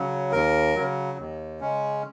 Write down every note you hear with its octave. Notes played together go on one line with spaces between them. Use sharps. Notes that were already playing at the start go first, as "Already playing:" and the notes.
Already playing: C#3 F#3
D#2 A#4
C#3 F#3
D#2
C#3 G#3 C#4